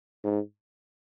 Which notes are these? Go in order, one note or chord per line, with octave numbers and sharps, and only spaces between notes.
G#2